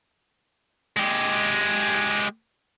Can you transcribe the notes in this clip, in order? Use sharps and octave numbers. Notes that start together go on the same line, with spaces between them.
G#3 G4